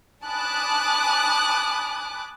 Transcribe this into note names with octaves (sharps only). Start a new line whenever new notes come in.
G#5 A5 B5 D6 D#6 F#6